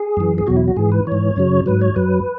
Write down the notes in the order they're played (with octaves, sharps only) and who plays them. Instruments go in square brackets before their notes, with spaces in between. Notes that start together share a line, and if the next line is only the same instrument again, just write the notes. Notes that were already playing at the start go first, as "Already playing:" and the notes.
Already playing: [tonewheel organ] G#4
F#2 E3
G#4
E2 B2 F#3 F#4
E4
F#4
G#2 E3 G#4
B4
G#2 E3 C#5
F#2 C#3 F#3
G#2 F#3 B4
C#5
F#2 F#3 B4